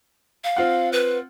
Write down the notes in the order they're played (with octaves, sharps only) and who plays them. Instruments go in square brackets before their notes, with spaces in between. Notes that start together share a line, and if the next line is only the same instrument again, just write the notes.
[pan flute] F5
[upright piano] C4 F4 F#5
[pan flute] B4